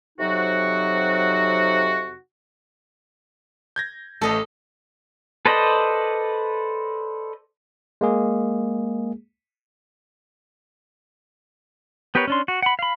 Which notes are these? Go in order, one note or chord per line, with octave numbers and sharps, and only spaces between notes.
F2 C3 F#3 D#4 F#4
G6 G#6 A#6
A1 A3 A4 D#5
A4 B4 C5 D5 D#5
G#3 A#3 G#4
B3 G4 A#4 B4 C#5
C#4 D4 C6
F#4
F#5 B5
F5 B5